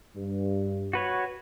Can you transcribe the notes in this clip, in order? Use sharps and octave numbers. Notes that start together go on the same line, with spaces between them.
G2
F#4 B4 C#5